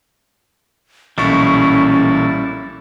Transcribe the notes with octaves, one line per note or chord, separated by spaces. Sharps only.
B1 A#2 E3 G3 C#4 E4 A4 C#6